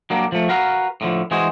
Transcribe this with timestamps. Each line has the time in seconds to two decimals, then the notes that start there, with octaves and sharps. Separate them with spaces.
0.10 F#3 G3 A#3 D4
0.32 F3 A3
0.49 F#4 A#4 B4 F5
1.01 A2 D3 F3
1.31 E3 G#3 F#4 G#4 C5